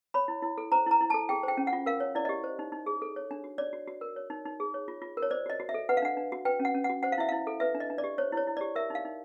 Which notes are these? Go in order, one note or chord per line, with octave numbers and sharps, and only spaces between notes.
C#5 B5
E4
E4
A4
C5 A#5
E4 A#5
E4
A5
A4
G#4 G5
C5 G5
C#4
F#5
F4
A#4 F5
C#5
E4 D5
G4 D#5
C5
D#4
D#4
G#4
A4
C#5
D4
F#4
C#5 D5
F#4
F#4
A#4
C#5
D#4
D#4
G#4
C#5
F4
F4
A#4
C#5
C5 D5
F#4 D#5
F#4
E5
A4
B4 F#5
F5
D4 F#5
D4
F#4
B4 G5
C#4
F#5
C#4
F#5
F#4
C5 F#5
F5
E4 E5
E4 F5
A4
B4 E5
D4
D#5
D4
D5
G4
C5 C#5
E4 C#5
E4
D5
G4
A#4 E5
D#4 F5
D#4